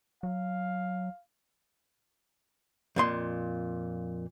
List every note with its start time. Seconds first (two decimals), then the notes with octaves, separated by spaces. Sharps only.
0.23 F#3 F5
2.96 F2 A#2 C6